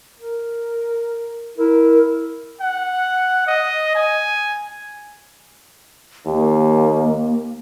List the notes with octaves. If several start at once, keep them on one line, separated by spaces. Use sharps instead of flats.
A#4
E4 A#4
F#5
D#5
G#5
D#2 A#3